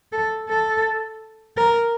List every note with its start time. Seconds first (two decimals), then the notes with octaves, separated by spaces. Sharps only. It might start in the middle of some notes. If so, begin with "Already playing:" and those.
0.12 A4
0.49 A4
1.57 A#4